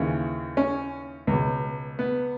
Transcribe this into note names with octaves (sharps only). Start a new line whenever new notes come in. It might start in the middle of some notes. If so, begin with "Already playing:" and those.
Already playing: D#2 C#3 E3
C#4
C#2 B2
B3